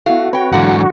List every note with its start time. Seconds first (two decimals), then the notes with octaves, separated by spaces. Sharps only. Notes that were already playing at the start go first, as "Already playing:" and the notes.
0.06 A3 B3 E4 F#4 F5
0.33 C4 B4 C#5 G5 B5
0.52 G#2 D3 E3 F#3 A#3 D4 F#5